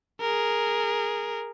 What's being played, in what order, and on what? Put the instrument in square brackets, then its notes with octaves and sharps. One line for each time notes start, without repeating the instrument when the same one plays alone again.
[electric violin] G#4 A#4